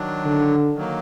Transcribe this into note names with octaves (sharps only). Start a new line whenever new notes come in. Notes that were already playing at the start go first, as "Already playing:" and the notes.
Already playing: D#3 F#3 D4
D3
D#3 F#3 A#3